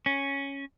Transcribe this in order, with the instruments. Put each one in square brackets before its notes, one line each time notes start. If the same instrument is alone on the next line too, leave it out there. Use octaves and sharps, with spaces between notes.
[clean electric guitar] C#4